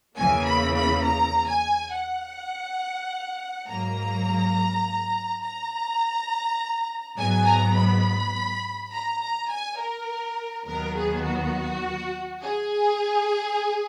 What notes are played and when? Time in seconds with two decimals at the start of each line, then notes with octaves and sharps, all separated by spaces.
0.17 E2 C#3 E3 A#3 G#5
0.46 B5
0.75 B5
1.04 A#5
1.48 G#5
1.92 F#5
3.67 G#2 F#3 A#3 A#5
5.42 A#5
7.17 G#2 F#3 B3 G#5
7.45 A#5
7.75 B5
8.91 A#5
9.20 A#5
9.50 G#5
9.78 A#4
10.66 D#2 D#3 F#3 B3 A#4
10.95 G#4
11.25 F#4
12.42 G#4